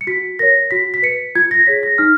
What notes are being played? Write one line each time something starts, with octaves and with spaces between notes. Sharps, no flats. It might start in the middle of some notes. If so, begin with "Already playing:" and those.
C#7
F#4 B6
A#4 C#5 A#6
F#4 B6
B6
B4 C#7
F4 G#6
A#6
G#4 C#5 B6
A#6
D#4 F6